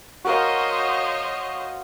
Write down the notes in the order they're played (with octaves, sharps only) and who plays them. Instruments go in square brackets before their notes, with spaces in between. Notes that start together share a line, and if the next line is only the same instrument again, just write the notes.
[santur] F#4 A#4 F5 [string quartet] C5 C#5 D#5